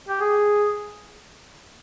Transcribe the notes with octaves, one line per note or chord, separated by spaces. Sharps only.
G4
G#4